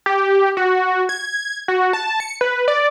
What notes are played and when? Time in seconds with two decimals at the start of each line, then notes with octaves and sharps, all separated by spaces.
0.06 G4
0.57 F#4
1.09 G#6
1.68 F#4
1.93 A5
2.20 C#7
2.41 B4
2.68 D5